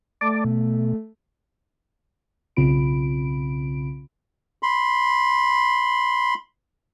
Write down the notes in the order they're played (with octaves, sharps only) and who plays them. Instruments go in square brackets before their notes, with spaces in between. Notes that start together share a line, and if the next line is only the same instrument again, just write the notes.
[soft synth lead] A3 [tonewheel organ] D5 A5 D6
[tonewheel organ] B2
[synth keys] B1 C#3 C4 F4 B5 D7
[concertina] B5 C6